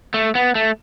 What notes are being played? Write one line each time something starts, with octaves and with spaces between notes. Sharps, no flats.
A3
B3
A3